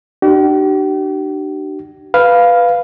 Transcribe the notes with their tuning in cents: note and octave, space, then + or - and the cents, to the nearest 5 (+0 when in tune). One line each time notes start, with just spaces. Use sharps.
D4 +40 G4 -45
B4 +0 F5 +0